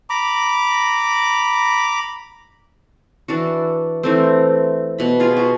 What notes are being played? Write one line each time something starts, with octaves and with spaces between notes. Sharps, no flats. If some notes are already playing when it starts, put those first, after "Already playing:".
A#5 B5 D6
E3 D4 F#4
E3 A3 C4
B2 B5
F4 G#4
F#4